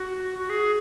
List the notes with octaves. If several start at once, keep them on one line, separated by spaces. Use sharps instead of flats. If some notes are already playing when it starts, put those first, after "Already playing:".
Already playing: F#4
F#4
G#4